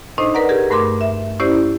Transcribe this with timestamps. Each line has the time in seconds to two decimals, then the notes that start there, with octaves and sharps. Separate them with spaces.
0.18 A2 D4 D#4 C5 D#5
0.34 A#4 B4 D5 F#5 A#5
0.49 G4 G#4 A#4
0.70 G2 A3 A#4 C6 D6
1.01 E5
1.40 C#4 E4 G4 C5 D5